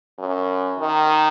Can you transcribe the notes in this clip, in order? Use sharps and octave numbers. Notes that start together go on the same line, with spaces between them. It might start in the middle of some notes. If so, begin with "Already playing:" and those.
F#2
D#3